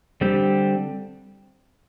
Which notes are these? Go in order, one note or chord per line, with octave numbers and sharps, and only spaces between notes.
D3 G3 C4 G4